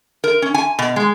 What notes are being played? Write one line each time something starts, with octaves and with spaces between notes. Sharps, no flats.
A#4
C#4
G#5
B2
G#3